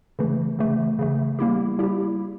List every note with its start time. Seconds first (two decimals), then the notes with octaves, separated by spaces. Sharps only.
0.19 C#3 E3 A3
0.59 C#3 E3 A3
0.99 C#3 E3 A3
1.39 G3 A#3 E4 G4
1.79 G3 A#3 E4 G4